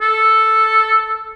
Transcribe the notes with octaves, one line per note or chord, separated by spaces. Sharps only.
A4